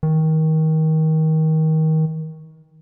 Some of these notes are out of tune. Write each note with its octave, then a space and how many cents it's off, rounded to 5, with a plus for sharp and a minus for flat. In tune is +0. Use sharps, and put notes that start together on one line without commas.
D#3 +25